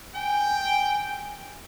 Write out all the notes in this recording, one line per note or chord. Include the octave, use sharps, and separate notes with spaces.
G5 G#5